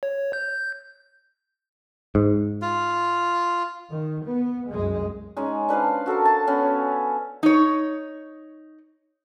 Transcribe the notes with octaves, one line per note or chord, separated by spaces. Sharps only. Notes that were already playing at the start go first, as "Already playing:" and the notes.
C#5
G6
G#2
F4
D#3
B3
C2 F#2 G#3
G#3 C#4 D#4
D4 B4 C5 F5
F#4 A4 A#4 F5
A5
B3 C#4 B4 F5
D#4 C#5